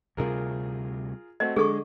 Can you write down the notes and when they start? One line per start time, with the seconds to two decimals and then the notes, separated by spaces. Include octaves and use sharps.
0.17 D2 C3 G3 F4 G#4 A#4
1.40 A3 C4 F#4 D#5
1.56 D3 G#3 G#4 A4 C#6 D6